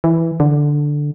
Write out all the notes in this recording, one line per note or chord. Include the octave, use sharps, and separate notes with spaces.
E3
D3